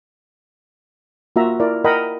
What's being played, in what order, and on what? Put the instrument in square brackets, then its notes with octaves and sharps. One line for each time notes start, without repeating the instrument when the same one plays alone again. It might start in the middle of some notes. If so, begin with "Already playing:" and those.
[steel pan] A#3 F4 F#4 E5 A#5
E4 A#4 D5
A#4 D#5 F#5 G5 B5